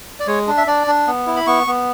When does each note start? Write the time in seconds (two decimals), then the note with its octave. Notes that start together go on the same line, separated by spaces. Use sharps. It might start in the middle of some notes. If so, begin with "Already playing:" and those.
0.20 D5
0.27 G#3 C#5
0.47 D4
0.57 E5
0.67 D4 D5
0.87 D4
1.07 B3
1.27 E4
1.36 B5
1.47 B3 C#6
1.67 B3